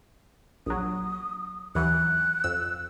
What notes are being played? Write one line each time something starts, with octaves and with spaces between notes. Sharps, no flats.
A#1 F#3 D#6
D#2 E3 F#3 F#6
F2 E6